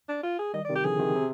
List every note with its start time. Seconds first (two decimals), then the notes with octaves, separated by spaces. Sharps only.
0.09 D4
0.23 F4
0.39 G#4
0.54 D#3 G3 D#5
0.65 D5
0.69 C3 D#3
0.75 G4
0.84 D3 F3 G#4
0.99 C3 D#3
1.16 C3